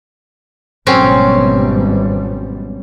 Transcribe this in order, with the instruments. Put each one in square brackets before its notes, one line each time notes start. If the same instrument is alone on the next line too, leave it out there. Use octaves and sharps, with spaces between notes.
[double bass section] G#1 B2 G3 [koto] F#3 C4 C#4